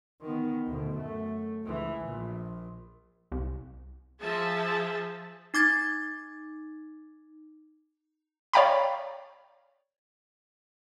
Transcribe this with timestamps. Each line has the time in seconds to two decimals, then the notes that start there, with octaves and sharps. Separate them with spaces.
0.21 D#3 B3
0.67 D2 B2
0.95 F#2 A3
1.65 C#2 E3
2.03 A#1 A#2
3.32 C2
4.19 F3 G#4 E5 A5
5.54 D#4 D6 G#6 A6
8.53 C#5 D5 F5 G5 A#5 B5